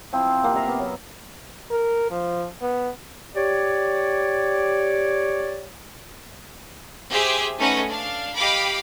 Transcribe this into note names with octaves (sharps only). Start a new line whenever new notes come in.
F3 C4 E4 F4
C3 A#3 F#5
E5 F5 A#5
B3
F#3
A#4
F3
B3
G4 C#5 D5
G4 G#4 C5 E5
A3 C#4 D#4 B4 D#5 F#5
D4 F5
G4 D#5 F5 G5 B5 D6